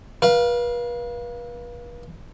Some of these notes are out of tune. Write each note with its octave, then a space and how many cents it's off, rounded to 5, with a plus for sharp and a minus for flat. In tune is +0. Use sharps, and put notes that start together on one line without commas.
B4 -40 F5 +0